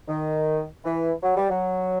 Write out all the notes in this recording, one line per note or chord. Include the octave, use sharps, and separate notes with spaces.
D#3
E3
F#3
G3
F#3